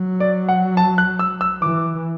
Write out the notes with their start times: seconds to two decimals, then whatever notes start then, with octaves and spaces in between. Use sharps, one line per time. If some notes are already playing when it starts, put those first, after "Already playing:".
Already playing: F#3
0.20 D5
0.49 F#5
0.77 A5
0.98 F#6
1.19 E6
1.41 E6
1.62 E3 D6